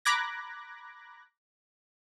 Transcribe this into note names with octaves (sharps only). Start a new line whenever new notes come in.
A#5 B5 D6 F#6 G#6 A#6